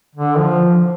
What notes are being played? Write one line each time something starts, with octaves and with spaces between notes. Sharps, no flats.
D3
F3